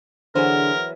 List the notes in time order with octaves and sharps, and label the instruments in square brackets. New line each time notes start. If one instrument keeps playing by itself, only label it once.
[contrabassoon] D3 [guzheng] E3 F#3 B3 [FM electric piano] G#4 C5 [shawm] A#4